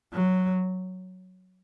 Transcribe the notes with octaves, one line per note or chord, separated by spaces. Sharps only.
F#3